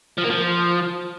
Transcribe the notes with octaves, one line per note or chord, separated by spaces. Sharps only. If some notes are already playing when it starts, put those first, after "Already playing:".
F3
A#3
F3